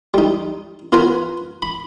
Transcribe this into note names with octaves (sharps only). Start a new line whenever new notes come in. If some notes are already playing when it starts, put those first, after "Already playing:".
G3 D#4
B3 F4 B4 G#5 A#5
B5